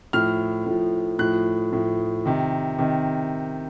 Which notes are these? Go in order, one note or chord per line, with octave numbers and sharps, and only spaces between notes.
A2 F3 F6
A2 F3
A2 F3 F#6
A2 F3
C3 D#3
C3 D#3